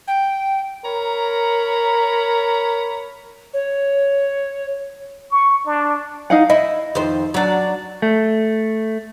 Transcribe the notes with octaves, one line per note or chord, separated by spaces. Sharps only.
G5
A#4 C#5 A#5 B5
C#5
C#6
D4
D#4 F5 F#5
E4 D#5 E5
F2 D#3 C5
F#3 D4
A3